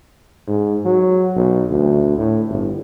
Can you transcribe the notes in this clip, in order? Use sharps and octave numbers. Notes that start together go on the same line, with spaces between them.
G#2
F#3
B1
D2
A2
G1